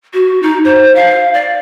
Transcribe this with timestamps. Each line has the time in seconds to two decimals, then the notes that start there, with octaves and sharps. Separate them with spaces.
0.14 F#4
0.42 D#4
0.65 C5
0.95 F5
1.34 D5